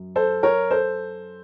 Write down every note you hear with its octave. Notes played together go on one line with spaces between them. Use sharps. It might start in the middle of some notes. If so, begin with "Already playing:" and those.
Already playing: F#2
A4 C5
A#4 C#5
A4 C5